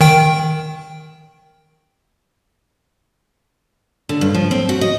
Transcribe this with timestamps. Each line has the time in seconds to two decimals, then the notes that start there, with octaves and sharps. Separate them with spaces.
0.01 D#3 G5
4.09 D3
4.21 G2
4.34 F3
4.51 C4
4.69 F#4
4.81 D#5